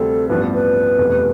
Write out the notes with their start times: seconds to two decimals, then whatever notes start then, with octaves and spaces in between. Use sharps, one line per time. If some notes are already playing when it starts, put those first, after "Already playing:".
Already playing: D2 C3 G3 C4 A4
0.29 A1 G2 F3 B3 D4 B4
0.54 B4
0.98 F1 E2 B2 G3